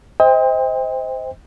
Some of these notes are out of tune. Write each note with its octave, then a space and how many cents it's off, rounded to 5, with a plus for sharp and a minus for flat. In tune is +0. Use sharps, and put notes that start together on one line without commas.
C5 -10 D#5 +35 G5 +30